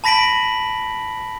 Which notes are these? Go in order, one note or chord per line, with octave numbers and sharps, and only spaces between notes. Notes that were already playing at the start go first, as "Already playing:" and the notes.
A5 B5 A#6 B6 D7 F#7